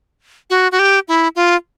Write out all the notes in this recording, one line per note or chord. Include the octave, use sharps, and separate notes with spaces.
F#4
F#4
G4
E4
F4